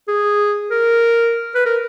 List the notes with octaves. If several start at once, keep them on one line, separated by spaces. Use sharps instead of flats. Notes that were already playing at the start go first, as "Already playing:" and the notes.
G#4
A#4
B4
A#4